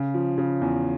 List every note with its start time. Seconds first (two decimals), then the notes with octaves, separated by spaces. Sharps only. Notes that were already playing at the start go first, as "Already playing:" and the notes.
Already playing: C#3
0.14 F3
0.38 C#3
0.61 E2